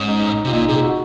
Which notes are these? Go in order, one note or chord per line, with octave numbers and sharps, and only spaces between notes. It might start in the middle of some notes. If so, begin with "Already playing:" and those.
Already playing: G#2 C#4
D#4
C3
F4
A#2 D#4
C3 G#4
F#4